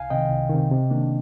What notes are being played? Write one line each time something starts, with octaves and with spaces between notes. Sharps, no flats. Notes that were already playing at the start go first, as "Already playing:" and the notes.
Already playing: C2 F5 G#5
C3 D#3 D#5 G5
C2
C3 D#3
C3
D#3 A#3 D4